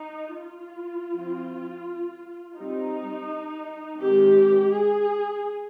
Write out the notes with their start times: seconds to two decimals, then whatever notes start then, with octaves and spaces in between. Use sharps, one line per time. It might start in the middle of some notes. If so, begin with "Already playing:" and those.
Already playing: D#4
0.41 F4
1.13 F3 C4
2.57 G3 C4 D#4
4.01 D#3 G#3 C4 G4
4.73 G#4